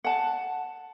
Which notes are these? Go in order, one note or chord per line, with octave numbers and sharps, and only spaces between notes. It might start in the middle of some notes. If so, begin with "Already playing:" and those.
F#5 A5